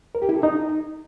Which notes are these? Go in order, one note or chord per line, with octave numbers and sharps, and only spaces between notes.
A#4
G4
E4
A4
D#4